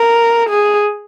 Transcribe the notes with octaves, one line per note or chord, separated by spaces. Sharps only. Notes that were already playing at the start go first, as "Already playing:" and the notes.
Already playing: A#4
G#4